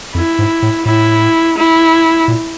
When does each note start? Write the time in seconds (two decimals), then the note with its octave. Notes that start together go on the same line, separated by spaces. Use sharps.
0.15 F2 E4
0.39 G#2
0.62 A2
0.85 A2 E4
1.57 E4
2.28 A#2